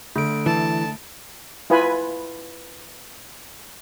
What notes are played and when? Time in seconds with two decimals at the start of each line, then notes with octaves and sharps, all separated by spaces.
0.16 D3 A3 D7
0.46 E3 A5
1.70 E4 F4 B4 G#5 B5